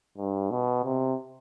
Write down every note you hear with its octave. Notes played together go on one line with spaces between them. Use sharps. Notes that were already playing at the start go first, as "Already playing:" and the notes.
G2
B2
C3